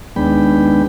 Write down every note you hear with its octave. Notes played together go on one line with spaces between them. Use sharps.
D#2 G#3 B3 D4 G5 B5